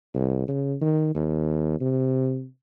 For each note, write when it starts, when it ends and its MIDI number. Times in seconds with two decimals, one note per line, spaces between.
0.14 0.44 36
0.48 0.75 49
0.81 1.10 51
1.15 1.80 39
1.80 2.46 48